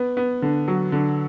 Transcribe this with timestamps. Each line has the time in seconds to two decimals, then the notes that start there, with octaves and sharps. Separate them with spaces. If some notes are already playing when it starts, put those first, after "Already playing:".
Already playing: B3
0.17 B3
0.42 D3
0.68 F#3
0.92 D3